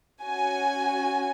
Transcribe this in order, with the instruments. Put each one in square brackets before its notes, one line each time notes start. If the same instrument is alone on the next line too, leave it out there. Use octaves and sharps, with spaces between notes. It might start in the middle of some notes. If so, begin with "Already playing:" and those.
[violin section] C#4 F#4 G#5